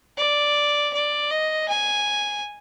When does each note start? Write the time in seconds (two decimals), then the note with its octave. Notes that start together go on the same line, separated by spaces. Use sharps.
0.17 D5
0.93 D5
1.30 D#5
1.68 G#5